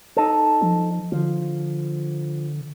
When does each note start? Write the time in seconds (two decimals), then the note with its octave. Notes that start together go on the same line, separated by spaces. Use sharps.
0.17 D#4 A4
0.62 F3
1.12 D3 F3